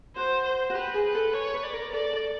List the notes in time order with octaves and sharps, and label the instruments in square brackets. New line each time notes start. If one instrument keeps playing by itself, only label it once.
[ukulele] F#4 [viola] C5
[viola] C5
[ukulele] F#4
[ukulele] G4 [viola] B4
[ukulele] G#4
[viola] B4
[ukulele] A4
[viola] C#5
[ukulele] B4
[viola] D5
[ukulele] A#4
[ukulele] A4 [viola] D5
[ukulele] A4